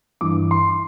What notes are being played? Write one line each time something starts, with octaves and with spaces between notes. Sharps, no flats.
G2 E3 D6
C6